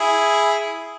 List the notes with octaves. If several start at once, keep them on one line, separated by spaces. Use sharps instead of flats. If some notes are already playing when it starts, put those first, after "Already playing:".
Already playing: E4 G#4